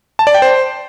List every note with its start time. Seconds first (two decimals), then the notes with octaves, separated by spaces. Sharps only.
0.19 A5
0.27 D5
0.34 G5
0.42 C5